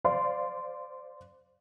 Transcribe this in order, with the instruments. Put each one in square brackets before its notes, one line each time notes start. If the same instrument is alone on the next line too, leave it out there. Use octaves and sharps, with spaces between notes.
[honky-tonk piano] C5 D5 F5 C6